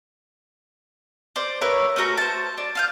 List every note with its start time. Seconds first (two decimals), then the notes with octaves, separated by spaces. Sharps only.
1.36 C5 D5
1.61 E4 A#4 B4 C#5
1.96 A3 C#4 F#4 A#5
2.17 C5 A5
2.58 D4
2.75 F4 F5 G6